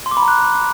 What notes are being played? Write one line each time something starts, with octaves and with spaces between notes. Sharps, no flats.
C6
D6
B5
A#5
F#6